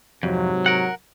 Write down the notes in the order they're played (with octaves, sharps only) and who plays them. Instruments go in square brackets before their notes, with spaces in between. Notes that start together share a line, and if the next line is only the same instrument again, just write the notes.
[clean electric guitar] F2 [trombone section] G#2 C3 F#3
[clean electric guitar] A#4 F#5